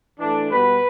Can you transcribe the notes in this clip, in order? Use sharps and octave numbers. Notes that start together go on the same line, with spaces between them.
A2 E3 A3 D4
B2 G3 B3 B4